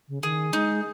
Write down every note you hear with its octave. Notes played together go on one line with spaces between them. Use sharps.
C#3
D#3 G#4
G#3 D#4